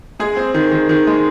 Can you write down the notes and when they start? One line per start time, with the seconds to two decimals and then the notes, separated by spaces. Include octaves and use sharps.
0.19 G#3 G#4
0.36 C4
0.54 D#3
0.71 D#3
0.89 D#3
1.07 G#3